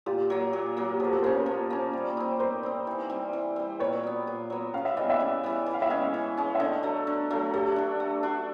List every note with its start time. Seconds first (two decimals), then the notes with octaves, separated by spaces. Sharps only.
0.06 A#2 F4 G4
0.30 F#3 A#3
0.53 A#2
0.77 F#3 A#3
0.92 G4
0.99 F3 F#4 G#4
1.07 A#4
1.11 G4 A4
1.23 A#3 C#4 A#4 C5
1.34 B4 C#5
1.46 F3
1.70 A#3 C#4
1.93 G3
2.17 C4 D#4
2.39 G3 A#4 C5
2.63 C4 D#4
2.87 E3
3.10 G3 C4
3.33 E3
3.56 G3 C4
3.80 A#2 B4 C#5
4.03 F#3 B3
4.27 A#2
4.50 F#3 B3
4.74 C#3 F5
4.85 E5
4.97 E3 G3 B3 D#5
5.09 D5 E5
5.20 C#3
5.43 E3 G3 B3
5.66 E3
5.74 F5
5.82 E5
5.90 G#3 C#4 D#5 F5
6.14 E3
6.37 G#3 C#4
6.55 E5
6.60 D3 C#5 D#5
6.83 F#3 A3
7.07 D3
7.30 F#3 A3
7.54 A3 G4 A4
7.76 D4 F#4
8.00 A3
8.23 D4 F#4